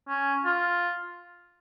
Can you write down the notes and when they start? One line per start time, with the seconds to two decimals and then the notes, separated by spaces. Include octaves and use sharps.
0.09 C#4
0.45 F4